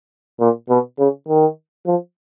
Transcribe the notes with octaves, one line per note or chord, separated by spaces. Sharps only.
A#2
B2
C#3
D#3
F3